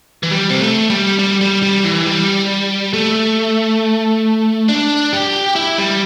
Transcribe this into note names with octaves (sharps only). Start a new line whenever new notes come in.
E3
G3
C4
A3
G3
G3
G3
G3
E3
G3
A3
D4
G4
E4
G3